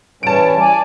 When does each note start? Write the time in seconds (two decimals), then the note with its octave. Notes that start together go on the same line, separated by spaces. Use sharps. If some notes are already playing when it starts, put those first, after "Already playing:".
0.23 E3 G3 C#4 A5 D7
0.60 D5 G#5